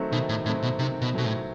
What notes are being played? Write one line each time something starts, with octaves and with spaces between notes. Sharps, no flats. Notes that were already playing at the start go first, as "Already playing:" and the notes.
Already playing: D#3 F#3 A3 C4
B2 D#3
A2
A2 F#3 A3 C4
B2
C3 D#3
B2
B2 F#3 A3 C4
A2